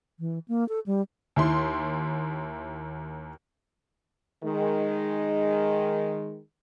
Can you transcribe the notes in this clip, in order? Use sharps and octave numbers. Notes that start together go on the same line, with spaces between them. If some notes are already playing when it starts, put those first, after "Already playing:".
E3
A#3
A4
G3
D#2 E4 C6
D#3 G#3